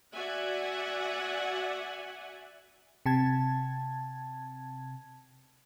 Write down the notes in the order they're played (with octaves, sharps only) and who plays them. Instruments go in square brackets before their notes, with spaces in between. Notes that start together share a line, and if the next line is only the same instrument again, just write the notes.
[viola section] F#4 D5 E5 F#5 G#5
[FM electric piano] C3 A5 G#6